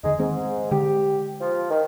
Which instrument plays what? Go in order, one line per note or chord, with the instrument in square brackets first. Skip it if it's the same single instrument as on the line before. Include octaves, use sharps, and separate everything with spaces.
[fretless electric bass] E2 D3 [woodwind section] G#3 D#4
[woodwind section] G#2 [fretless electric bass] D#3 G#3 C4
[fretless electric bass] D3 G#3 [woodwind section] G4
[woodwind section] F3
D#3